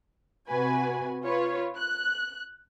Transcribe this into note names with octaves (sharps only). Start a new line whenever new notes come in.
C3 F#4 B4 G#5
F4 B4 C#5
F#6